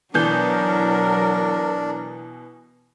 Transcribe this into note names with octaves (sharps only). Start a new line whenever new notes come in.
B2 E3 F#3 D4 A#4 G6